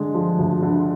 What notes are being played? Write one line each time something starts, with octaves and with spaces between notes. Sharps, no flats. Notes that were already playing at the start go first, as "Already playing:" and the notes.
Already playing: D3 G#3
F3
D2
D3